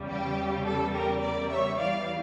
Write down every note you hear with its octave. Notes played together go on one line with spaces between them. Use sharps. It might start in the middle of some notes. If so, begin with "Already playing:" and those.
Already playing: E2 C#3 G3
G4
A4
G4 A#4
A#4 D5
C#5 E5
E2 E3 G3 D5 F5